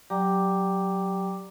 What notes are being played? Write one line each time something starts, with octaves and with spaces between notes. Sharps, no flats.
F#3 G4 D5 G5 A#5 D6